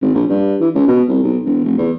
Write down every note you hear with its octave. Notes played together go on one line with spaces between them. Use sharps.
G#1
A#1
G2
E3
C#2
B2
C2
B1
E1
F1
E2